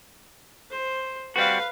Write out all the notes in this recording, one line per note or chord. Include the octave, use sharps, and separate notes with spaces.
C5
G3 C4 F#4 B4 F5